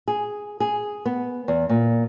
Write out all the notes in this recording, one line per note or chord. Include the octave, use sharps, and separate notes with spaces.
G#4
G#4
B3
E2
A#2